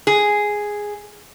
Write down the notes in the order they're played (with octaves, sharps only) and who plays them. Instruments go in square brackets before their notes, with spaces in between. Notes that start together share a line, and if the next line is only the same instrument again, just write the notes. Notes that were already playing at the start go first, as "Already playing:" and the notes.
[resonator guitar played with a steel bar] G#4